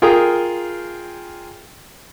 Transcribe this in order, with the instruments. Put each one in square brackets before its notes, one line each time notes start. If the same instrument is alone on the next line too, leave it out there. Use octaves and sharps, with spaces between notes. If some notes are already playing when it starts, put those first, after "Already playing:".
[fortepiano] F4 G#4 A#4 G5 D#6